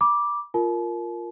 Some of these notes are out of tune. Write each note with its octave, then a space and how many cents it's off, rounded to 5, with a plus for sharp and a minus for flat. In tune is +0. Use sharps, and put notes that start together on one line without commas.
B5 -35 D6 +0
F4 +0 A#4 +0 A5 -40